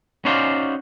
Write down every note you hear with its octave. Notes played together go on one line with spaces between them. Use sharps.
C#4 D#4 F#4 C5 D5 F5